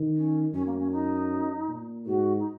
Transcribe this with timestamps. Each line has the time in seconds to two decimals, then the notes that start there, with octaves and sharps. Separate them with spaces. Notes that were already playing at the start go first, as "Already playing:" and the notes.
Already playing: D#3
0.16 C#4
0.53 F#2 C#4
0.66 A#3
0.79 C#4
0.91 D#4
1.68 A#2
2.06 G#2 F#4
2.39 D#4